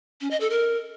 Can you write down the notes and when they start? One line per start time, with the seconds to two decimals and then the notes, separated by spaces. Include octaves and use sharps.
0.21 C#4
0.31 D#5
0.40 A4
0.50 A#4